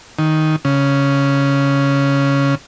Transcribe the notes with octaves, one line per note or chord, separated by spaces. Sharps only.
D#3
C#3